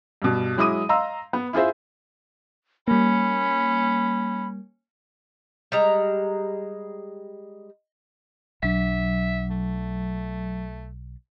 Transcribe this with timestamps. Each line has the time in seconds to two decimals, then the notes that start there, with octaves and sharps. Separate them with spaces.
0.22 G2 B2
0.57 F#3 G#3 E4 D6 D#6 D#7
0.89 D#5 F5 A#5 C6 E6
1.33 B3
1.53 E4 F4 G#4 C5 E5
2.88 G3 A#3 C#4 B5
5.72 G3 G#3 A#5
8.63 B1 F#3 D4 E5
9.51 A3